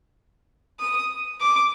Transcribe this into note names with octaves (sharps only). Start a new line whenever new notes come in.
D#6
D6